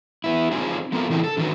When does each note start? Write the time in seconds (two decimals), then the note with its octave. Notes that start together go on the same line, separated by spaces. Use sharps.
0.24 B3 E4
0.51 C4 D#4 F4 G#4
0.92 A3 B3 C4 F4 A4 A#4
1.10 C#3 E3 E4 A4 C5 G5
1.24 A4
1.37 D3 D#3 D#4 F#4 B4